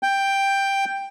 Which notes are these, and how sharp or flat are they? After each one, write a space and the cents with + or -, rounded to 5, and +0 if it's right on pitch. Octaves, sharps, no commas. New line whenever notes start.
G5 +5